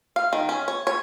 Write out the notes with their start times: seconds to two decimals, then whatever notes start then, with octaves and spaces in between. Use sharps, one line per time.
0.16 F5
0.33 D#3
0.49 C#4
0.68 C#5
0.87 C#5